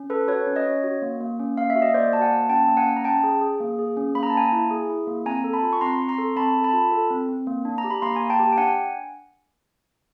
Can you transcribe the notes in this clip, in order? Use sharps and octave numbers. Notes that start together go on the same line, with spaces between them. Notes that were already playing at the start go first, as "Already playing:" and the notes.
Already playing: C#4
A4 B4
F#4 B4 C#5
C#4
C#5 D#5
C#4
F#4
A#3
A#3
C#4
A#3 F5
E5
F#4
D#5
A#3 C5 D5
F#4 A5
F#5 G#5
A#3
C#4 G5 A5
A#3
F#5 G#5
C#4
A#5
C#4 G5 A5
G#4
G#4
A#3
G#4
C#4
A#3 B5
A#5
A5
A#3 G#5 A#5
E4
G#4
E4
A#3
C4 G#5 A#5
A4
A5 B5
F4
C#6
C4 A#5 C6
C4 C#6
A#5 C6
A4
C4 A5 B5
A4
A5 B5
F4
A4
C4
C4
A#3
D4
A#5
G4
B5
A#3 A#5 C6
G#5 A#5
A#3
G5 A5
G4
G5
D4 F#5 G#5